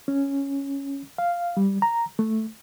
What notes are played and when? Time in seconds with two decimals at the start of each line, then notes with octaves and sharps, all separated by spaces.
0.08 C#4
1.18 F5
1.57 G3
1.82 A#5
2.19 A3